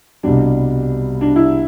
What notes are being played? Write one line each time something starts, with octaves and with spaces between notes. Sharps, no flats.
C2 B2 G3 D4
D4
E4